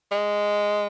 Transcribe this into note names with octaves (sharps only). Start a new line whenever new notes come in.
G#3